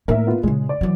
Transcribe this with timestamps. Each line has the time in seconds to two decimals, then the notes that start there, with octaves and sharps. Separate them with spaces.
0.08 A2 A#3 A#4 E5
0.27 B3 F4
0.43 A#2 C#3 G#3
0.69 D5
0.81 E3 F#3